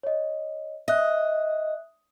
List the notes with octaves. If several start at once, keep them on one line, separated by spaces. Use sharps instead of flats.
C#5 D#5
D#5 E5 F#6